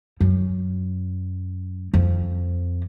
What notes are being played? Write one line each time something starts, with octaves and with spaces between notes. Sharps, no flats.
F#2
F2